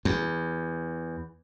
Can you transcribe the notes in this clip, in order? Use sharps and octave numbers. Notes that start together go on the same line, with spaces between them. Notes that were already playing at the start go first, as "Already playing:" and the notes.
E2